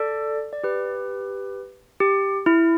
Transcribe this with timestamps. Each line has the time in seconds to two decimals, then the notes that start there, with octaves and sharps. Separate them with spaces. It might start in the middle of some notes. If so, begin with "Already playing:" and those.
Already playing: A4 D5
0.53 D5
0.64 G4 B4
2.00 G4
2.46 E4